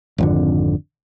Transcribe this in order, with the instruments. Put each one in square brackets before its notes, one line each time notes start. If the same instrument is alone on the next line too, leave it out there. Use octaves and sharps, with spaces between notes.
[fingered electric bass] G#1 F2 D3